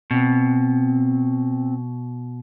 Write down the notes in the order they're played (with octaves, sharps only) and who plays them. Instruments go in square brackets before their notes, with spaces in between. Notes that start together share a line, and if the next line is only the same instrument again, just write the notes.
[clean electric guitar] B2 [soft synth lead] C4